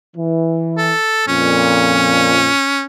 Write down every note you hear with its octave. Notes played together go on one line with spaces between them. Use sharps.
E3
A4
F2 A#2 C#4